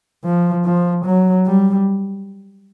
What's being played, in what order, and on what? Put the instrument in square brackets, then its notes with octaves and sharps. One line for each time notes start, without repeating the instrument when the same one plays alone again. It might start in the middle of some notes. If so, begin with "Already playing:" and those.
[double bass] F3
F3
F#3
G3